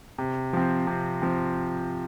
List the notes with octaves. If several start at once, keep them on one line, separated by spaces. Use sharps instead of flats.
C3
F3 C4
C3
F3 C4